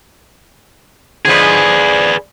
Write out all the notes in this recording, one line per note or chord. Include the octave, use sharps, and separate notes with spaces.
D3 F3 G#3 G#4 B4